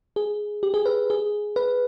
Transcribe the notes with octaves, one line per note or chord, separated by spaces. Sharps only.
G#4
G4
G#4
B4
G#4
B4